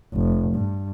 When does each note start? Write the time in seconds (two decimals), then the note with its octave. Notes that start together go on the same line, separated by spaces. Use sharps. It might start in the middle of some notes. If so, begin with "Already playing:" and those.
0.14 F1
0.55 G2